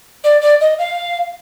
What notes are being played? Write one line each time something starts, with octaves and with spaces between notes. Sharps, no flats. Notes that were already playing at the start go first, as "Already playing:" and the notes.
D5
D5
D#5
F5